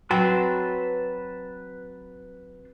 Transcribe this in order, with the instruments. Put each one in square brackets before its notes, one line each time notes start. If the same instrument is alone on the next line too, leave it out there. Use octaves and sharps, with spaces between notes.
[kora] F#3 C4 [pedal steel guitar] B4 A5 C6